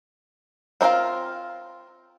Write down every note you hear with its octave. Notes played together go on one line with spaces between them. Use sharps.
C4 D#4 F4 A#4 F5